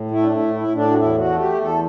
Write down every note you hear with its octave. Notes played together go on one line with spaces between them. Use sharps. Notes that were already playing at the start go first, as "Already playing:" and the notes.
Already playing: A2
A3 E4
D4
E4
A2
E4
A2
D4
F#4
E2 E4
F#4
A3
G4
E2
A4